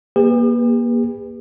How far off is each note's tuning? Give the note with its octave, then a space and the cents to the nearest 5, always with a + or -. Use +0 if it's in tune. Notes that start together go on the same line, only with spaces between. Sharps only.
A#3 +25 G4 +45 B4 +0